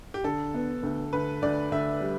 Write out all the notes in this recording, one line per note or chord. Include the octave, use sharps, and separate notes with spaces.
G4
D3 A4
B3
D2
D2 B4
D2 D5
D2 E5
G3